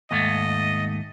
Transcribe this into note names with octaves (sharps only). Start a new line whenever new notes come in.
D#2 G#2 A3 D#5